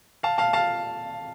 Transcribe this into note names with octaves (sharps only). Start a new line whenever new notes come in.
F5 A5
F5 A5
F5 A5